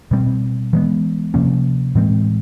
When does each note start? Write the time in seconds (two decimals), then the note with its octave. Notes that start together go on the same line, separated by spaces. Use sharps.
0.11 B2 G3 C4
0.73 E3 G#3 B3
1.34 C3 F3 A#3 C#4
1.95 A2 E3 G#3 C4